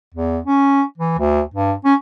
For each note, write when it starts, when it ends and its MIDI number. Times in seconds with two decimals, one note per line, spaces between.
0.15 0.39 40
0.46 0.82 61
0.98 1.18 52
1.18 1.41 38
1.54 1.73 43
1.85 1.94 61